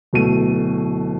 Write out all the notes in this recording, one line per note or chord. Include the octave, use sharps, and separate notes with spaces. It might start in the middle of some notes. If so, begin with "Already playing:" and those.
D1 B2 A3 D#7